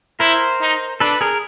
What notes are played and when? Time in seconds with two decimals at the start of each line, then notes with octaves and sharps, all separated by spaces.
0.20 E4 A#4 C5
0.61 D#4
1.00 D4 A4 B4
1.21 G#4 A#4